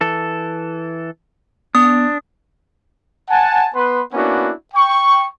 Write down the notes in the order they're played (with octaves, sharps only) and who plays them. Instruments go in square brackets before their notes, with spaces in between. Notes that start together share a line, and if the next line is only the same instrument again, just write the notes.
[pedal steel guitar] E3 A4
[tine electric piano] B3 [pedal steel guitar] D4 [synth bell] D#6
[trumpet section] F#5 G#5 A5
B3 B4 C6
A#3 B3 C#4 D4 E4 F#4
G5 C#6